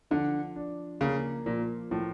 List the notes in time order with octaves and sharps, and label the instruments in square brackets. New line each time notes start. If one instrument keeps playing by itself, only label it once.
[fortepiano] D3 [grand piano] F3
[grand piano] D4
[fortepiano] C#3 [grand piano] A#3
[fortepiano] A#2 [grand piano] F3
[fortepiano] A2 [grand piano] F3